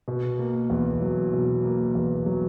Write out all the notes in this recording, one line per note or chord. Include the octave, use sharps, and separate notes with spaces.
B2
A#3
E2
F#3
B2
A#3
E2
F#3